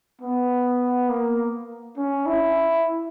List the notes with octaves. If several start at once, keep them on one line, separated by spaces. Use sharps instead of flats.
B3
A#3
C#4
E4